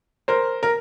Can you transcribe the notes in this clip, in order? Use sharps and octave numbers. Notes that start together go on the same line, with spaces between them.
A#4 C5
A#4